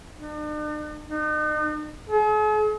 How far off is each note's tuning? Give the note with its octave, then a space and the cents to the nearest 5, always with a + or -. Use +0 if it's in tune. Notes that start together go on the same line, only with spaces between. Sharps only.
D4 +45
D#4 -40
G#4 +45